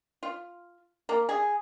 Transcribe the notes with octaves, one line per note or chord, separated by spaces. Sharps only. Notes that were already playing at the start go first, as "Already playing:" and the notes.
F4
A#3
G#4